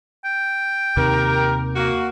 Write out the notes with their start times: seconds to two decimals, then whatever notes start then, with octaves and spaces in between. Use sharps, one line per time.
0.25 G5
0.97 D#2 C3 D#3 G4 A#4
1.75 A#3 F#4